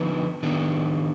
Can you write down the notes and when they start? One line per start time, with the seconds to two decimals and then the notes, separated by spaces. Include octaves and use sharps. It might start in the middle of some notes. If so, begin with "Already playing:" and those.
Already playing: D3 F3 B3 D#4 B4
0.43 D#3 B3 D4